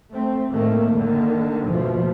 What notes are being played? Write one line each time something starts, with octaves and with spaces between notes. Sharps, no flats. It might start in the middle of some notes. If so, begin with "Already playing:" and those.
A3 C4
A2 D#3 A3 A#3
D3 D#3 A#3
D#2 B2 F3 A3